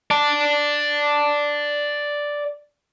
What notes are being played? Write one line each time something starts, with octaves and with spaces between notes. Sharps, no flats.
D5 A5